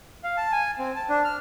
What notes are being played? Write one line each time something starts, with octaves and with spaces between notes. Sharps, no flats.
F5
A5
G#5
C4
A5
D4
F6